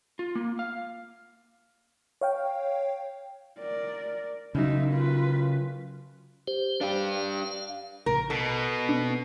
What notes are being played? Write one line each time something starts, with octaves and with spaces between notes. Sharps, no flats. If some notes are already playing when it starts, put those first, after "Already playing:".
F4
A#3
F5
C#5 F5 G5
A#4 D5
C#3 F#3 D#4 E5
F4 B4
G4 C5
D4 G4 F5
A#1 C#3 A#4
B2 A4
C4 D4